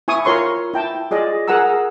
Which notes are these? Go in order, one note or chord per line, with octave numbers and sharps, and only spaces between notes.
E4 G#5 C#6 D#6
F4 A#4 C#5 C6 C#6
E4 G5 A5
F4 G#4 D5 D#5
G#4 A#4 F#5 G#5 A#5 E6